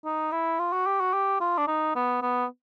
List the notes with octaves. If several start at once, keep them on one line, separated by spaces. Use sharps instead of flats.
D#4
E4
F4
F#4
G4
F#4
G4
F4
D4
D#4
B3
B3